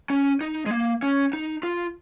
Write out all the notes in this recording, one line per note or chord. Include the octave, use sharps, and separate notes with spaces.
C#4
D#4
G#3
A#3
C#4
D#4
F4